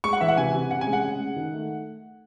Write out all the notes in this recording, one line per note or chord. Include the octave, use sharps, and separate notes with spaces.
G#3 C#6
F#5
E3 E5
F#5
C3 G#5
C3
C#3 F#5
G#5
G#3
F#5
C#3
G#3
D#3
A3